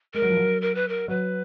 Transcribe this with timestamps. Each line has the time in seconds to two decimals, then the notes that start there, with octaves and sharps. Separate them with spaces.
0.14 G#3 A#4
0.22 F#3
0.30 F3
0.37 F#3
0.61 A#4
0.75 B4
0.88 A#4
1.08 F#3 B4